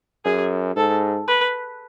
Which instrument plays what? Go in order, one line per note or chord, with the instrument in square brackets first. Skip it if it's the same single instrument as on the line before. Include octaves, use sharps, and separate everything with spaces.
[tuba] F#2 [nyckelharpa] G#4
[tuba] G#2 [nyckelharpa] A4
[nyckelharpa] B4